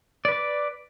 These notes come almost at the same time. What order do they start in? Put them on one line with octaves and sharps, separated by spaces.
D5 B4 D6